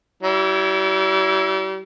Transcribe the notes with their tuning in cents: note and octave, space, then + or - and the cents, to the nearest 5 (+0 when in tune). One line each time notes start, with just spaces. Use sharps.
G3 -40 E4 +0